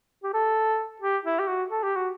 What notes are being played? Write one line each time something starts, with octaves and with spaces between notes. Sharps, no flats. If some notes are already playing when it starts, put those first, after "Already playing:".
G4
A4
G4
E4
G4
F#4
A4
G4
F#4